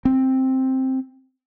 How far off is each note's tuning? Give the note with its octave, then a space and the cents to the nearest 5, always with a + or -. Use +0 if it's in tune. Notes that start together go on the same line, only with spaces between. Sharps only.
C4 +5